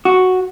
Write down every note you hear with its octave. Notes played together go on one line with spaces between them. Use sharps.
F#4